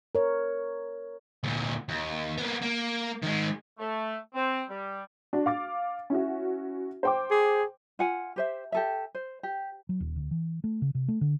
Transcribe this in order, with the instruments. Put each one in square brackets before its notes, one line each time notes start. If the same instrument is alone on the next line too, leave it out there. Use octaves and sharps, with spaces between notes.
[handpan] A#4 C#5
[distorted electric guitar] D2 A#2
D#2
A#3 B3
A#3
D#3 G#3
[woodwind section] A3
C4
G3
[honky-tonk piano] D4 F#4
F5 D6 A6
C#4 E4 F#4
C5 G5 D6
[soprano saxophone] G#4
[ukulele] F4 F#5 G#5
G4 C5 E5
G4 A4 E5
C5
G4
[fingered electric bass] F#3
D#1
D2
E3
A3
C#3
C3
A3
D3